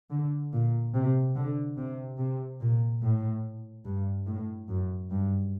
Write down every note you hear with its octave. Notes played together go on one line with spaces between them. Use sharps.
D3
A#2
C3
D3
C3
C3
A#2
A2
G2
A2
F#2
G2